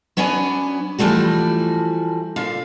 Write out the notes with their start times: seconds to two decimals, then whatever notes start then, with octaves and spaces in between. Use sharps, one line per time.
0.17 F#3 B3 C#4 D4 G#5
0.98 E3 F3 G3 A3 F#4
2.36 A#2 D3 F5